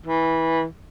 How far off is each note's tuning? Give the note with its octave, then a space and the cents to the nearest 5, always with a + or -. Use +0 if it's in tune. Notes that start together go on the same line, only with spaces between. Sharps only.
E3 -15